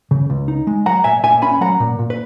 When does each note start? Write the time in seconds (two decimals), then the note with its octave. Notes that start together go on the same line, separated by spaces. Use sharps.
0.11 C#3
0.30 C#2
0.48 D#4
0.67 G#3
0.86 F#3 F#5 A#5
1.04 A#2 E5 G#5
1.23 A#2 E5 G#5
1.42 C#4 G#5 B5
1.61 F#3 F#5 A#5
1.80 A#2
1.99 A#2
2.10 B4